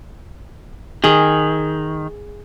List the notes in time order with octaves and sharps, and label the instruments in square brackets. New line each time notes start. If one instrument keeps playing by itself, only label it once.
[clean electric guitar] D#3 [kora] G#4